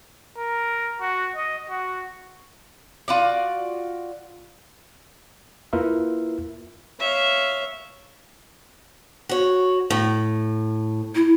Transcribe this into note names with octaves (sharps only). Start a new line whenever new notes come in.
A#4
F#4
D#5
F#4
F4 F#4 D5
A#3 E4 F4 A#4 B4 E5
C#5 E5 F5
F#4 C#5
A2
E4